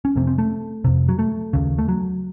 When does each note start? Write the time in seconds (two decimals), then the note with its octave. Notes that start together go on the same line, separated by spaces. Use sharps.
0.05 C#4
0.16 F2 C3 C4
0.27 C4
0.38 A3
0.84 F2 C3
1.08 F#3
1.19 A3
1.53 D#2 C#3
1.78 A3
1.89 F#3